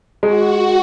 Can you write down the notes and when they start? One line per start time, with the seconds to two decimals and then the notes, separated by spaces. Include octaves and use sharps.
0.23 G#3 F#4